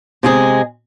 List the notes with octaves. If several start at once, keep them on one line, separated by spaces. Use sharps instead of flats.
C3 G#3 G#4